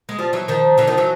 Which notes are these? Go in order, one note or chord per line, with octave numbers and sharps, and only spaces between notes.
G#3
F3 G3
E3 F#3
D#3 F3
D3 E3
D#3 F3
E3 F#3